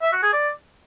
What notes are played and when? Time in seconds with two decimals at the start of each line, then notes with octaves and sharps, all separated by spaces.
0.02 E5
0.13 F#4
0.23 G#4
0.33 D5